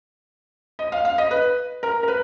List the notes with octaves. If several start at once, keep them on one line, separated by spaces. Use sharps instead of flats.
D#5
F5
F5
D#5
B4
A#4
A#4
B4